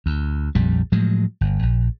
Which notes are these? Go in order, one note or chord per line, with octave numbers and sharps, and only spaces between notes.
D2
A#1 F2 G3
A2 F3 F#3 G#3
G1
A#1